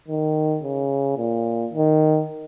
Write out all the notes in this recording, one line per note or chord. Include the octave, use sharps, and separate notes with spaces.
D#3
C#3
A#2
D#3